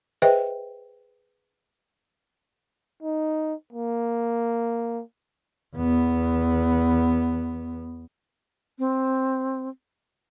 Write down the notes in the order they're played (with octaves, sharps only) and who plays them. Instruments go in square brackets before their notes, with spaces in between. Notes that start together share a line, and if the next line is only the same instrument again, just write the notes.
[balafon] G#4 B4 C5 D#5 E5 G5
[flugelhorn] D#4
A#3
[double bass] E2 B3
[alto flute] C4